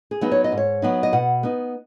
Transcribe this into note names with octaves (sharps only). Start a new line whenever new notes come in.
G#4
F#3 B3 D#4
C#5
D#5
G#2
C#5
F#3 B3 D#4
D#5
B2 F#5
B3 D#4